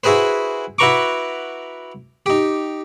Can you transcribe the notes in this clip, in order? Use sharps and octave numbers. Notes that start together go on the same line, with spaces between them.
E4 F#4 G#4 B4 C5
E4 F#4 B4 A#5 C#6 D6
D#4 G4